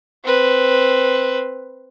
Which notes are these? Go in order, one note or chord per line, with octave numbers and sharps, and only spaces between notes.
C4 B4